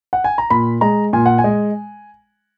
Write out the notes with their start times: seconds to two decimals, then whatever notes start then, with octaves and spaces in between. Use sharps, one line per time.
0.13 F#5
0.24 G#5
0.38 A#5
0.50 A#2 B5
0.81 G#3 A#5
1.13 A#2 G#5
1.26 F#5
1.38 G#5
1.44 G#3